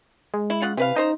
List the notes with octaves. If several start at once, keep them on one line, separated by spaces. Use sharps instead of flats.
G#3
E4
C#3 F4 F#5
C3 E3 B4 F5
C#3 D#4 C5 A#5